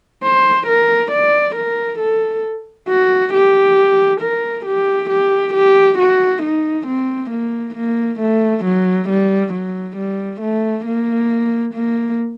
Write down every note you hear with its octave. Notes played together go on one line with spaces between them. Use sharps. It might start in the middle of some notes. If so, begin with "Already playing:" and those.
C5
A#4
D5
A#4
A4
F#4
G4
A#4
G4
G4
G4
F#4
D#4
C4
A#3
A#3
A3
F#3
G3
F#3
G3
A3
A#3
A#3